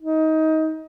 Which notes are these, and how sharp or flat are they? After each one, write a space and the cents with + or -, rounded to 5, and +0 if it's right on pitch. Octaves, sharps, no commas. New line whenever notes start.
D#4 +20